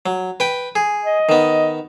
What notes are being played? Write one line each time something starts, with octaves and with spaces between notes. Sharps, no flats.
F#3
B4 G5
G#4
D#5
D#3 B3